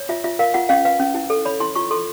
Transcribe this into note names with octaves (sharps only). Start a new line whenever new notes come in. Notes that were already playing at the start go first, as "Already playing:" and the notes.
Already playing: C#5
F4 E5
F4 E5
A#4 F5
F4 F#5
C#4 F5
B4 F5
C#4
E4
A4
C#5 B5
E4 C6
F4 C#6
A4 C6